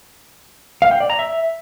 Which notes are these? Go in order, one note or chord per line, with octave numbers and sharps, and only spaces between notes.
F5
G5
D5
A#5
E5